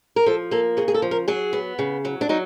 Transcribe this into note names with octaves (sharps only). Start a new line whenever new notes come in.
A#4
F3 A4
A#3 A4
C#3 G#4
G#4
A4
F3
A#4
F#3 G#4
B3
C#3
F#3
D4
F#3 D#4